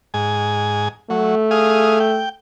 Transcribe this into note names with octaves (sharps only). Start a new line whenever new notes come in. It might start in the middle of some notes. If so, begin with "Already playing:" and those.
G#2 G#5
F#3 A3
G#4 F5 D#6
G5